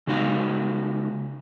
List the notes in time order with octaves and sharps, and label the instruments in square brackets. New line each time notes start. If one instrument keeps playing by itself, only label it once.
[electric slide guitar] C#3 G#3 D#4 F#4 F5